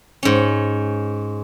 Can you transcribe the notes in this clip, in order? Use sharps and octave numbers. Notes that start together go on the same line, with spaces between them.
G#2 C#4